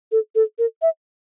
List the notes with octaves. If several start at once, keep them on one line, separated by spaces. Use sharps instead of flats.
A4
A4
A#4
E5